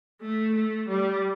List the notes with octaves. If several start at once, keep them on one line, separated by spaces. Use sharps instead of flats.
A3
A3
G3